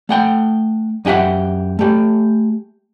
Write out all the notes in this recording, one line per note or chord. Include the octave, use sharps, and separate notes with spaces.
A3 F#5 G5
F#2 D#4 G4 E5 F#5
A3 G4